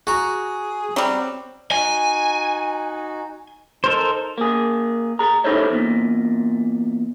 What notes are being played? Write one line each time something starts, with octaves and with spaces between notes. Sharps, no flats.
F#4 G#4 A#5
F#3 G3 C4
D#4 F#4 G#5
D#4 A4 A#4 C5
A#3 G#4
G#4 A#5
D#4 E4 A4 C5 C#5
E2 A#2